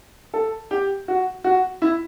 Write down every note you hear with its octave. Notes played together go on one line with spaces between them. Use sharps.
A4
G4
F#4
F#4
E4